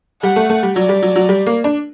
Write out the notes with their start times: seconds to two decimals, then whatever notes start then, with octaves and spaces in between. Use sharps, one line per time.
0.23 G3 F#5
0.36 A3
0.50 A3
0.63 G3
0.76 F#3 D5
0.89 G3
1.02 F#3
1.16 F#3
1.29 G3
1.47 A#3
1.64 D4